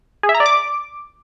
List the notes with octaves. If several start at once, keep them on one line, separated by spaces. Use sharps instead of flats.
G#4
E5
A#5
D5
D6